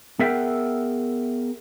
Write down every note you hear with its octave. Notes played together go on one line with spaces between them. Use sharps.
B3 G#4 A#4 E5 F#5 G5